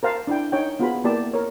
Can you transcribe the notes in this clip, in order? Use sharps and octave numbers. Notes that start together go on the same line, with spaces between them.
A#4 C5 F5 A5
D4 E4 G5
D#4 C#5 G5
B3 F4 F#4 G#4 C5 B5
A#3 B3 E4 G4 D5 A5
A#4 C#5